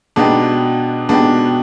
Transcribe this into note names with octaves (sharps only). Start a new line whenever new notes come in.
B2 G#3 B3 D4 D#4 G4
B2 G#3 B3 D4 D#4 G4